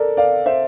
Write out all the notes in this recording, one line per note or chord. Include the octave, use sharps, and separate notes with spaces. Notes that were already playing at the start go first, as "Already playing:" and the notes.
Already playing: A4 A#4 D5
D5 F5
C5 E5